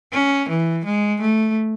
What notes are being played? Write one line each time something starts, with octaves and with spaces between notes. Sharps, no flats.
C#4
E3
G#3
A3